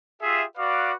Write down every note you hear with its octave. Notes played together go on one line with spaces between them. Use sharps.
F4 G4 G#4 E5
F#4 B4 D5 F5 D6